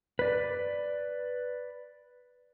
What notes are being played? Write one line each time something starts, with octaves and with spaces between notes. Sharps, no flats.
B4 D5